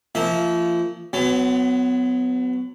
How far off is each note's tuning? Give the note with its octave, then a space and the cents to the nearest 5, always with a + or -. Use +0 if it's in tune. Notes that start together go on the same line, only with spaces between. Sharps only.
F3 -25 A#3 -35 E5 -25
F#3 +0 B3 +35